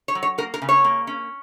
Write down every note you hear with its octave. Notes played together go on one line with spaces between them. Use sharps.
C#5
F#3
C#5
A#3 A#4
A#4
C#3
C#5
A#3
C#4